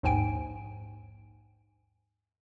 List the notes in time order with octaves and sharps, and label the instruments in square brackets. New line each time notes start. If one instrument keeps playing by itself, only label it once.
[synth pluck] A#1 D#2 G#2 G5 G#5 D7